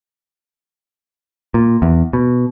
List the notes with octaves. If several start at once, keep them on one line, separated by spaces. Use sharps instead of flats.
A#2
E2
B2